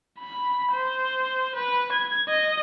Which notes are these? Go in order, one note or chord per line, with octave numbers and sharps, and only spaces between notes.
B5
C5
B4
G#6
D#5